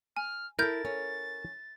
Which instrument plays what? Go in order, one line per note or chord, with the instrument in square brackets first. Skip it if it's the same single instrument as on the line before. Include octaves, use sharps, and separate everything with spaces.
[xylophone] G#5 [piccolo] F6
[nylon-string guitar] E4 A4 [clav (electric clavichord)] A#4 [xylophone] F6 G6 [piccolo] A6
[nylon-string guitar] C#4